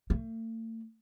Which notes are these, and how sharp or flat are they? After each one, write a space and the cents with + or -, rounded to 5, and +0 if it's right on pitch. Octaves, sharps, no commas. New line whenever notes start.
A3 +45